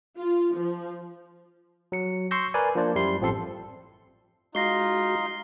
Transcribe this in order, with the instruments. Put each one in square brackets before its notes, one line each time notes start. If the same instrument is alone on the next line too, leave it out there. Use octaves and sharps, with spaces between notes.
[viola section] F4
F3
[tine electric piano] F#3 C#7
C6 C#6 E6 G6 A#6
A#4 B4 D5 G#5
F3 A#3 D4 C5 D5
F#2 G3 E4 C6
A1 F3 C4 A4 C6
[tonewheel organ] G#3 F#4 [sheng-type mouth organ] D#4 F4 [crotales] A#6 C7 G7